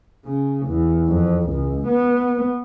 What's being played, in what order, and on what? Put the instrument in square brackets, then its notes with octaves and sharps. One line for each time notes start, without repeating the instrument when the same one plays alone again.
[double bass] C#3
E2
F2
C#2
B3